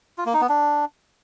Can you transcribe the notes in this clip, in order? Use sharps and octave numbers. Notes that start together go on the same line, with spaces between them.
F4
A#3
D#4
B3
D4